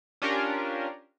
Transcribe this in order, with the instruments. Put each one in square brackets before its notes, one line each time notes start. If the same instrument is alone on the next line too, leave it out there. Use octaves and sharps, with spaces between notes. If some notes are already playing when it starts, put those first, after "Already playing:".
[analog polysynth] C#4 D4 F4 G4 A#4